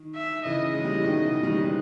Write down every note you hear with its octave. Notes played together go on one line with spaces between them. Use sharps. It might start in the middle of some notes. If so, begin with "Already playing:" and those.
Already playing: D#3
E5
C#3 E3 D#5
G#3
G3
E3
B2 D#3
C#3 E3
D#3 G3
E3 G#3